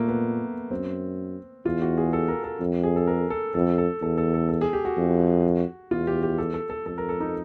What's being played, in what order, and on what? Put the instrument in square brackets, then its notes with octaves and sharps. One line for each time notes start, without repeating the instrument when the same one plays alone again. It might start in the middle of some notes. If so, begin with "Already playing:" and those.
Already playing: [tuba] A#2 [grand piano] A3 A#3
[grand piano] B3
[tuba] F#2 [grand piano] C4
[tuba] E2 [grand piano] F4
[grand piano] F#4
G#4
A4
A#4
A4
[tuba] F2
[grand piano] G#4
A4
A#4
A4
[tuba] F2 [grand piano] A4
[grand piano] A4
[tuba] E2 [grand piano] A4
[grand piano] A4
A4
A4
G#4
G4
F#4
[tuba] F2
[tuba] E2 [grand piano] F4
[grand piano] G4
G4
A4
A4
A4
[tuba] F2 [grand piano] A4
[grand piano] A#4
A4
D#4